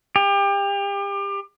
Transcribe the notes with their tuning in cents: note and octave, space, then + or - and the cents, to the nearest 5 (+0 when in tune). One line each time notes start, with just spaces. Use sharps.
G4 +30